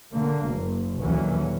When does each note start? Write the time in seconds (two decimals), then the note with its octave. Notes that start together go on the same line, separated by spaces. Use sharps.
0.13 D3 A#3
0.45 F#1
1.01 D#2 A#2 D3 E3 F#3 C#4